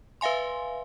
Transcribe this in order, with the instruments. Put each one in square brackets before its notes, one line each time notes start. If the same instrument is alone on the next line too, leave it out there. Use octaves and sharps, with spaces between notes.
[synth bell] B4 E5 F5 G#5 C6